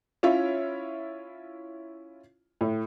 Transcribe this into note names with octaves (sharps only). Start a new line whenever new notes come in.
C#4 E4 F4 C#5
A2